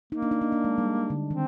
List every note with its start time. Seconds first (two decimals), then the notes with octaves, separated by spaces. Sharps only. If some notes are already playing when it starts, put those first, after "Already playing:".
0.12 A#3 D#4
0.22 D4
0.31 D#4
0.41 D4
0.52 D4
0.64 G#3
0.78 G3
1.10 D3
1.30 D#3 C4